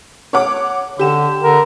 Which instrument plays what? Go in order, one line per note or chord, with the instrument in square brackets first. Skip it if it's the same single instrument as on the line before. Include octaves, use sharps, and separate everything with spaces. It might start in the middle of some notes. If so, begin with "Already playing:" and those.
[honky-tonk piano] C#5 F#5 D6
[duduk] D3 [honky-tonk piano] G4 E7
[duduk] D3 [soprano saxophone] A#4